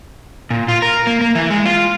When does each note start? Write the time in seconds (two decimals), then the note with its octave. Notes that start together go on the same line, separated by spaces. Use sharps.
0.50 A#2
0.68 F4
0.82 A#4
1.07 A#3
1.21 A#3
1.35 E3
1.50 G#3
1.65 F4